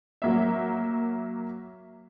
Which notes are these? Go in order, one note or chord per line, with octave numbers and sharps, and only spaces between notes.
F#3 A#3 E5